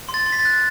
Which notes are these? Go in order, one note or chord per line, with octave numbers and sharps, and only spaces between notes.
C6
A6
C6
B6
A6
F#6